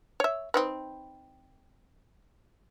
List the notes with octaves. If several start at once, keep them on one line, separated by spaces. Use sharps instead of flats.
C#5 E5
C4 D#4 B4